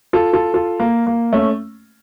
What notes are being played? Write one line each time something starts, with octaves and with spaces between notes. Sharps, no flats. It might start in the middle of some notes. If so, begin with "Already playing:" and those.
F4 A4
F4 A4
F4 A4
A#3
A#3
A3 C#4